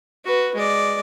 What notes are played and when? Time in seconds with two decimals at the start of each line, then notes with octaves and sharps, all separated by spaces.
0.25 F#4 B4
0.54 G#3 D5